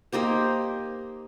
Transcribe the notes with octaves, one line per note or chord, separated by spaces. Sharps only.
A#3 D#4 G4 C5